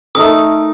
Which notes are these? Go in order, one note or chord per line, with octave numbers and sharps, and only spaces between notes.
A3 D#4 A#4 D#6